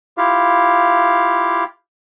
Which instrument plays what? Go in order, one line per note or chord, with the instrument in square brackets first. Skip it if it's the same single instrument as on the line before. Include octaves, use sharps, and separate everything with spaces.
[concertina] E4 F4 G4 F5